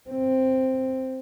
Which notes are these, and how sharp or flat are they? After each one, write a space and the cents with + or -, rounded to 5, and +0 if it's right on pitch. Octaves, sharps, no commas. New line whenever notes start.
C4 +0